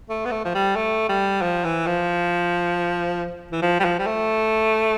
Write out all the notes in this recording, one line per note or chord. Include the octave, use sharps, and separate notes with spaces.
A3
B3
A3
F3
G3
A3
G3
F3
E3
F3
E3
F3
G3
F3
G3
A3